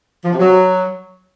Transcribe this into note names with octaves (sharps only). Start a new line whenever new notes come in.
F3
C3
F#3